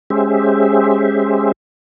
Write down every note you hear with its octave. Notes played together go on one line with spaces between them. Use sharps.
G#3 C#4 G4 G#4 C5 E5